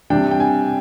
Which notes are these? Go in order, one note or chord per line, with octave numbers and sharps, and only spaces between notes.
C3 G3 D4 G5
G5
G#5